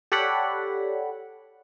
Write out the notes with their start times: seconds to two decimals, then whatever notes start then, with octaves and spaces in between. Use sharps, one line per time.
0.12 G4 A4 C#5 D5 F#5 B5